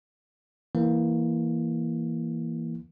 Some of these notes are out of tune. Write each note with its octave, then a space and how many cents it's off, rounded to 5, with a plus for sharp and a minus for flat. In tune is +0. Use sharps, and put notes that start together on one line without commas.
E3 +0 A#3 +0